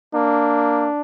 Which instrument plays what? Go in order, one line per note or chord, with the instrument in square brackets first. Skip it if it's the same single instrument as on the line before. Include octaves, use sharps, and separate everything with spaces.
[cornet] A#3 [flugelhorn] D4